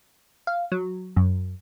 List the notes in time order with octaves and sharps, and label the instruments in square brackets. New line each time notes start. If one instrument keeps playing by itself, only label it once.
[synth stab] F5
F#3
F#2